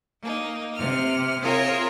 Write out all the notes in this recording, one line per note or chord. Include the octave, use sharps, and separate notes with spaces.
A#3 D#4
C3 F6
C4 F4 G#4 A#4 C#5 E5